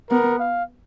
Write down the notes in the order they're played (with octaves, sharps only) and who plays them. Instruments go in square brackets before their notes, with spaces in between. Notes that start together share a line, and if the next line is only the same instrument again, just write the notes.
[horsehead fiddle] B3 [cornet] A#4
[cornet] F5